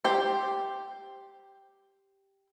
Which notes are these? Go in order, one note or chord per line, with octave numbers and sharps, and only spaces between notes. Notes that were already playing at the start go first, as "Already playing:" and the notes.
G4 C5